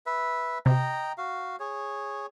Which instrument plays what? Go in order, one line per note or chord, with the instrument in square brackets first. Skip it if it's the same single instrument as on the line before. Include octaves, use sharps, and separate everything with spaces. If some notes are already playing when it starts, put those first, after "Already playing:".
[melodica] B4 E5
[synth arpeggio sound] C3 [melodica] D#5 G5 A#5
[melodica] F#4 F5
G#4 C#5